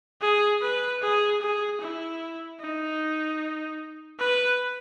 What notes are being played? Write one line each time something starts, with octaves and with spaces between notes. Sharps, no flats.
G#4
B4
G#4
G#4
E4
D#4
B4